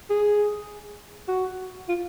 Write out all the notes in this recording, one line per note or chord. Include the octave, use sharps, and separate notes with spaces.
G#4
F#4
F4